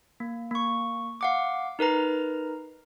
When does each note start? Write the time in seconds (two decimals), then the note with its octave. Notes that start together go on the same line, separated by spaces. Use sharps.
0.20 A#3
0.51 A#3 C#6
1.21 F5 F#5 D6
1.79 D#4 A#4 B4 A#5